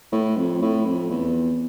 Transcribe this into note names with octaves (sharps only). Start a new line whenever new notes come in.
A2
F2
A2
F2
E2